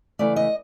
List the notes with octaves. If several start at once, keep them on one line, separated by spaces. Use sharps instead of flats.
C#3 E3 A3 D5
D#5